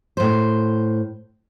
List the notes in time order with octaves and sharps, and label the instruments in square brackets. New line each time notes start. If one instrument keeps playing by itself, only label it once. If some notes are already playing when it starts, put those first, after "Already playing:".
[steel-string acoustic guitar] A2 C5